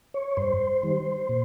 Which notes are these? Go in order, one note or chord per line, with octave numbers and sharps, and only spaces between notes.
C#5
G2 C5
D#3 G3
A#2